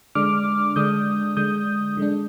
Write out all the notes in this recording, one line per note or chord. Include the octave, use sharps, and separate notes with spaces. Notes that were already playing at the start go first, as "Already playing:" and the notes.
D3 G#3 D4 D6 F6
D3 G#3 D4 D#6 G6
D3 G#3 D4 D#6 G6
D3 G#3 D4